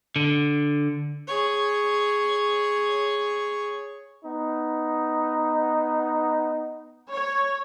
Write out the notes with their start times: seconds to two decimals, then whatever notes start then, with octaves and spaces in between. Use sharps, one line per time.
0.16 D3
1.28 G#4 C#5
4.25 B3 D#4
7.10 C#5